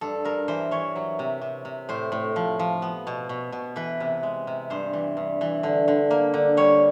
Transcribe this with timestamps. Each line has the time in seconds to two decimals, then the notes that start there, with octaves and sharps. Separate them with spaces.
0.01 G2 A4
0.25 G2 A#4
0.48 E3 C5
0.71 E3 C#5
0.96 F#3
1.19 C3
1.41 C3
1.65 C3
1.89 A2 C5
2.12 A2
2.36 F3
2.59 F3
2.82 B3
3.07 B2
3.29 B2
3.52 B2
3.76 E3 B4
4.00 C3
4.23 G#3
4.47 C3
4.70 G2 C5
4.93 E3
5.17 G2
5.41 E3
5.63 D3
5.88 D3
6.11 A#3
6.34 D3
6.57 G3 C#5